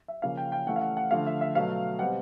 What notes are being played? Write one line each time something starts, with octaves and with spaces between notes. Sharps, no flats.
E5
C#3 F3 A#3 C#4 F5
G5
G5
E3 A3 C#4 F#5
F5
F#5
F#5
D3 F3 A3 F5
E5
E5
B2 F#3 A3 F5
B2 G3 C4 F#5